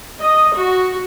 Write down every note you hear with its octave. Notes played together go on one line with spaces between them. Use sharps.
D#5
F#4